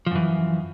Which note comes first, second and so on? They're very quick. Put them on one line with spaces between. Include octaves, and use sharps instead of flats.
F3 F#2 E3